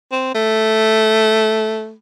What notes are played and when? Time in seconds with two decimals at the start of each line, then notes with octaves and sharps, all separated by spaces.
0.12 C4
0.35 A3